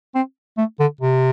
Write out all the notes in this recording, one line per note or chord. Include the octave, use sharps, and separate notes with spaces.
C4
A3
D3
C3